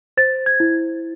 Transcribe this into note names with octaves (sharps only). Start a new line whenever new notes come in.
C5 A6
G#6
E4